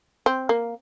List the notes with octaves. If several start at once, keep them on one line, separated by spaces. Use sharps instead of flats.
C4
A#3